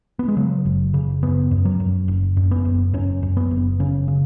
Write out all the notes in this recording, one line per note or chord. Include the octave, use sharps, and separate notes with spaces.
B3
G#3
C#3 F#3
F#1
C#3
F#2 B3
F#2
F#3
F#2
F#1
F#2
B3
F#1
F#2 C#4
F#2
B3
F#1
C#3 C#4
C#3